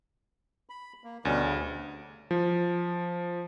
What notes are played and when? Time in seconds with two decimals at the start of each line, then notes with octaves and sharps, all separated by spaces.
0.69 B5
1.04 A#3
1.25 D2 B2 G3 C#4
1.43 C#3
2.31 F3